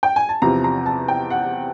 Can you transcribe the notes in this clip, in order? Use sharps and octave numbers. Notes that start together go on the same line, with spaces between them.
G5
G#5
A5
E2 C3 F3 A#5
A#5
A5
G5
F#5